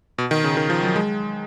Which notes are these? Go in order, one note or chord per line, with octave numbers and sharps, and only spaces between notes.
B2
D#3
C#3
D#3
F3
F#3
G#3